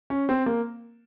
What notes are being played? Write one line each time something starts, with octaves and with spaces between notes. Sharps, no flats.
C#4
C4
A#3